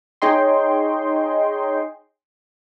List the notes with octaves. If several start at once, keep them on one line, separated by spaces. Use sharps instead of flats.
D#4 G#4 C#5 D#5 G5 C6